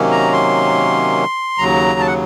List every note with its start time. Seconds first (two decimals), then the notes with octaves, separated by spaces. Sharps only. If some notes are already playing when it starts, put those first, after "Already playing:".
Already playing: C3 D#3 F#3 A#3 C#4
0.11 A#5
0.32 C6
1.58 D#2 C#3 F#3 A#5
2.00 A5
2.07 F#5